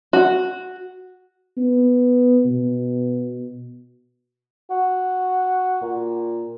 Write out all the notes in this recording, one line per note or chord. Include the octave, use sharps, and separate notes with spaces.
F#4
B3
B2
F#4
A#2